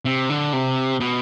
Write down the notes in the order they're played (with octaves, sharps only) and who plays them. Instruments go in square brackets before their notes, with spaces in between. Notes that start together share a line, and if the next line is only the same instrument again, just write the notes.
[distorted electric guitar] C3
D3
C3
B2